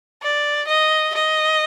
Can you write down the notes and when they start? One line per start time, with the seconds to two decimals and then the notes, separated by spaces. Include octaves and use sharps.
0.22 D5
0.67 D#5
1.14 D#5